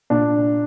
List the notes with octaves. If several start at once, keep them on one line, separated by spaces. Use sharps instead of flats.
A#2 D4